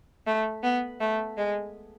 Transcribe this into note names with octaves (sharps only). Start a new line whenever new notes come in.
A3
B3
A3
G#3